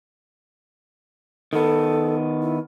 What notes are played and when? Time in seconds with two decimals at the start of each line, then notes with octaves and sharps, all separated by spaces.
1.53 D#3 B3 A4
2.42 E4